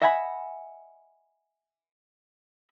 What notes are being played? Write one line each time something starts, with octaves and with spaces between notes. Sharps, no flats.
D#5 E5 F#5 G#5 A5 B5